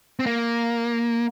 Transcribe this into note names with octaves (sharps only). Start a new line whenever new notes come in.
C4
A#3